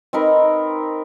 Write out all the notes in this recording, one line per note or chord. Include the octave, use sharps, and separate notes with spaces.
C4 D#4 A#4 B4